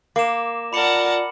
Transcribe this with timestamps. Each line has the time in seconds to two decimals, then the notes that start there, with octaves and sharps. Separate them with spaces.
0.16 A#3 D6 E7
0.73 F4 A#4 D5 F#5 A5 B5 C#7 F#7